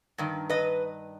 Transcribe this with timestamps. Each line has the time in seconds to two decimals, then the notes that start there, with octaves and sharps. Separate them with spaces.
0.18 G2 D#3
0.50 B4 D#5